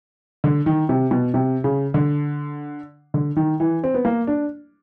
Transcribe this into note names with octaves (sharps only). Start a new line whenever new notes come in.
D3
D#3
C3
B2
C3
C#3
D3
D3
D#3
E3
C4
B3
A#3
D4